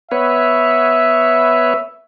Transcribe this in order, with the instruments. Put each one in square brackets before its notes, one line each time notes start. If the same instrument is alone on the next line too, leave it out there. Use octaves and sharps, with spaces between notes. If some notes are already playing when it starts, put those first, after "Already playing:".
[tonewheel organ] B3 B4 C#5 [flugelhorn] E5